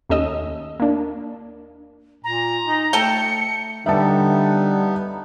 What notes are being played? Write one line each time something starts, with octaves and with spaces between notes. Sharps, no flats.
D#2 A3 C#4 D#5 E6
A#3 D4
A#2 A#5
D#4
A3 A4 G5 C#7
D3 G3 B3 D#4 E5 A5